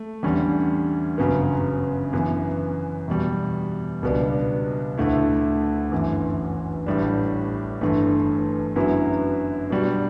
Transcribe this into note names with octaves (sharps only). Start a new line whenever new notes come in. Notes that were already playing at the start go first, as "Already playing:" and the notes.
Already playing: A3
E2 D3 G3 C#4
G1 F#2 C#3 F#3 B3
F#2 E3 B3
E2 B2 G3
C#2 B2 G3 B3 D4
D2 D3 A3 E4
G1 F#2 E3
A1 A2 G3 D4
G1 G2 E3 A3
F#2 D3 F#3 B3 E4
B2 G3 D4 F#4